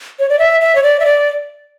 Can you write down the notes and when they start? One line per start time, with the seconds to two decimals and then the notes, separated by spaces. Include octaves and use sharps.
0.19 C#5
0.29 D5
0.39 E5
0.61 E5
0.75 C#5
0.83 D5
1.00 E5
1.05 D5